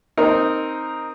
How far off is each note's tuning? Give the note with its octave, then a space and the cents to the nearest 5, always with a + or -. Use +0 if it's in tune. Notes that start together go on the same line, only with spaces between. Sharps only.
C4 +0 D#4 +0 A#4 +0